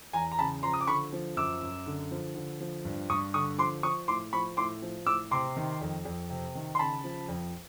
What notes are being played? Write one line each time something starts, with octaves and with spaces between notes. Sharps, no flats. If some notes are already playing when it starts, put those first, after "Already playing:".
E2 G#5 A#5
A#5
C#3 A5 B5
F3 A#5 C6
D#6
D6
D3 B5 C#6
F3
F#2 D6 E6
F#2
D3
F3
D3
F3
G2
G2 C#6 D#6
D3 C#6 D#6
F3 C6 D6
F3 C#6 D#6
A2 C6 D6
F3 B5 C#6
A2 C6 D6
F3
A2 D6 E6
C3 C6 D6
D#3
F2
F2
C3
D#3
C6
C#3 A5 B5
F3
F2